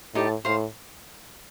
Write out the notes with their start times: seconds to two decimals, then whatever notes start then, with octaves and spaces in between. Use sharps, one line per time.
0.15 A2 D#4 G4 D5 A5
0.45 A2 C5 F5 C6